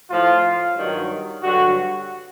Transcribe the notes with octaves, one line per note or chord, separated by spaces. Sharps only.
A2 F3 F4
G2 D#3 F#3
G2 D3 F#3 F#4